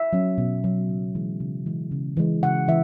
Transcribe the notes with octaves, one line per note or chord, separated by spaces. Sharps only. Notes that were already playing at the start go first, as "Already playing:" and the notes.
Already playing: E5
F#3 C#4
B2
F#3 C#4
C#3
E3 G#3
C#3
E3 G#3
C#3
E3 G#3
C#3 F#5
E3 E5